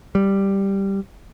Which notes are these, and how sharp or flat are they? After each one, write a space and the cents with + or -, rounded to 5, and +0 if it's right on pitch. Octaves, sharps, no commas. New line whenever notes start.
G3 +0